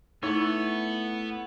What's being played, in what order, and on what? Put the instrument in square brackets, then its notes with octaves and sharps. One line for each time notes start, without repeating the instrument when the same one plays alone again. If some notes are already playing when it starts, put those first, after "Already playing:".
[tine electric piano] A3 E4 [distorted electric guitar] B3 [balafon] D#4 [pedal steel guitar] A4 C#5